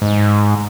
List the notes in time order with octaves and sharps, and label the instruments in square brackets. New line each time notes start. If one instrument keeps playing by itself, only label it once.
[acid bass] G#2